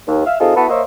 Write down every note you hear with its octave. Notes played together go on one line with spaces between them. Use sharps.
D#2
E5 F5
C3 C4 D#4 F4 G#4 A4
B3 E4 F#4 A4 B4
A#3 C5 C#5 D#5 E5